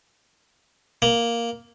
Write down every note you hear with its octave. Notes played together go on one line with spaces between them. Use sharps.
A#3